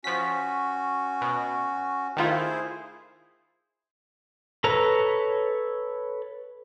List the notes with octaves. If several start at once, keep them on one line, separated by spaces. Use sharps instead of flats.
F3 C#4 F#4 B6
B2
D#3 A3 E4 F4 G#4 C5
A4 B4 C#5 A#5